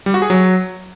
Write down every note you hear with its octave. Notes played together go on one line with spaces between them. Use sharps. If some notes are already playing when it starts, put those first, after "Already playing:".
G3
F#4
G#4
F#3